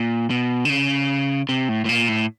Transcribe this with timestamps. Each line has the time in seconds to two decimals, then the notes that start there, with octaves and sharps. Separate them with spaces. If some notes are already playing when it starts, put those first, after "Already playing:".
Already playing: A#2
0.30 B2
0.65 D3
0.70 C#3
1.49 C3
1.69 A2
1.85 A2
1.89 A#2
2.09 A2